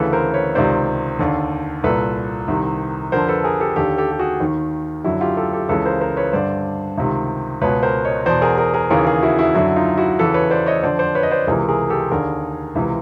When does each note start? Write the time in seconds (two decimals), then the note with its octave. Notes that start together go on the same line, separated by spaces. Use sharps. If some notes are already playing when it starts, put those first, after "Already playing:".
Already playing: D2 C#3 E3 A4 B4
0.13 A#4 C5
0.34 B4 C#5
0.55 C#2 C3 D#3 C5 D5
1.19 D#2 D3
1.84 C2 A#2 A4 B4
2.48 C2 C3 D#3
3.12 F2 D3 A#4 C5
3.28 A4 B4
3.44 G#4 A#4
3.60 G4 A4
3.76 D#2 D3 G4 A4
3.97 G4 A4
4.11 G4
4.19 F#4 G#4
4.40 D#2 D#3
5.04 F#2 D3 E4 F#4
5.21 F4 G4
5.37 G4 A4
5.53 G4 A4
5.69 C#2 C#3 E3 A4 B4
5.85 A#4 C5
6.01 A#4 C5
6.17 B4 C#5
6.33 G2 D3 C5 D5
6.98 C#2 C3 D#3
7.62 C#2 B2 B4 C#5
7.83 A#4 C5
8.04 C#5 D#5
8.26 E2 B2 C5 D5
8.42 G#4 A#4
8.58 G#4 A#4
8.74 G#4 A#4
8.90 D#2 C#3 E3 G#4 A#4
9.07 G#4 A#4
9.22 E4 F#4
9.39 E4 F#4
9.55 F#2 D3 E4 F#4
9.76 D#4 F4
9.97 E4 F#4
10.19 E2 C#3 E3 A4 B4
10.34 B4 C#5
10.51 C5 D5
10.66 C#5 D#5
10.83 F2 D3 C5 D5
10.99 C5 D5
11.15 B4 C#5
11.23 D#5
11.31 C5 D5
11.47 C#2 C3 E3 G#4 A#4
11.68 G#4 A#4
11.90 G4 A4
12.11 D#2 D3 G#4 A#4
12.75 C#2 C3 E3